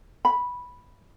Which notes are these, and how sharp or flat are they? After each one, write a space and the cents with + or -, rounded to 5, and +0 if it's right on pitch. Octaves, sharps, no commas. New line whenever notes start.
B5 -5